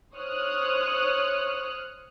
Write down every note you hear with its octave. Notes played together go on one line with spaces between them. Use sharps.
C5 C#5 D#6 F6 F#6